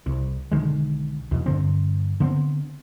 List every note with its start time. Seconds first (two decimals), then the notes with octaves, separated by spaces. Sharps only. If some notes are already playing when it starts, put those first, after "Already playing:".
0.06 C2
0.52 B1 D3 D#3 G#3
1.31 B1 E2 B2
1.46 G2 D3 C4
2.20 D3 B3 C4